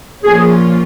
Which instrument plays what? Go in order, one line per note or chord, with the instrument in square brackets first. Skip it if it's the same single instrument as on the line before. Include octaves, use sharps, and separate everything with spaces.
[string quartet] A#2 F3 A#3 C#4 F4 [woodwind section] G#4